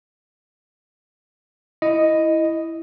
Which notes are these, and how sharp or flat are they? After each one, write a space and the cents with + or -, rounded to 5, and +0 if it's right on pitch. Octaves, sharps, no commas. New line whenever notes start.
E4 +0 D#5 +0